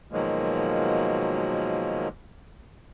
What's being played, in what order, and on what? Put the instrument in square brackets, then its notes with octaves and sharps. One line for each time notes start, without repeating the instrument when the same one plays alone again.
[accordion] B2 D#3 F3 F#3 G#3 A#3